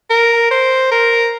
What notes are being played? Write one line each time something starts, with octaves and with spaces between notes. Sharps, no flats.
A#4
C5
A#4